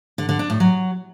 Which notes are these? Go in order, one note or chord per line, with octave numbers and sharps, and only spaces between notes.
D3
D3
D4
A2
F#3